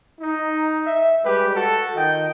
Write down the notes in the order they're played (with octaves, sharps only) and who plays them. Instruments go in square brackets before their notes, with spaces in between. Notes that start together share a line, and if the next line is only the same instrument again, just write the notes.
[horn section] D#4
[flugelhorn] E5
[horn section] G3 G#3 G4 [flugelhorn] B4
[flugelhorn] F#4 [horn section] A4
[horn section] D#3 F4 G5 [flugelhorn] D#5